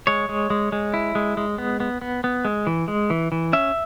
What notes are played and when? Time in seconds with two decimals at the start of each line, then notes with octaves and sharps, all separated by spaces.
0.07 G#3 C#5
0.29 G#3
0.50 G#3
0.72 G#3
0.94 E4
1.15 G#3
1.37 G#3
1.58 B3
1.80 B3
2.02 B3
2.24 B3
2.45 G#3
2.67 E3
2.88 G#3
3.10 E3
3.32 E3
3.53 C#4 E5